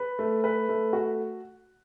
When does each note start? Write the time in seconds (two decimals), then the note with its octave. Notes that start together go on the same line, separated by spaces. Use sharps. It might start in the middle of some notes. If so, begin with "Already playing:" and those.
Already playing: B4
0.19 A3
0.44 B4
0.69 A3
0.93 F#4